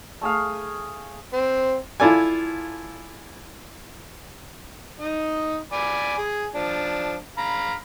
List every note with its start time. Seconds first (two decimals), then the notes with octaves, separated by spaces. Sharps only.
0.21 A3 G#4 F5
1.34 C4
2.00 E4 F4 A4 D5 G#5
5.00 D#4 D#5
5.72 D5 G#5 B5
6.18 G#4
6.55 F3 D4
7.38 F5 A#5 B5